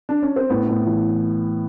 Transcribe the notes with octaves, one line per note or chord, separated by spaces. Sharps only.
D4
C#4
C4
A2 B3
A2
E3